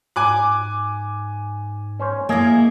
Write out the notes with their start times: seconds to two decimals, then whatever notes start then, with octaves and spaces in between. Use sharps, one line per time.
0.16 G#2 G#5 D6 F#6
2.00 C#4 C5 C#5
2.29 A#3 E4 G#4 D#5 G#5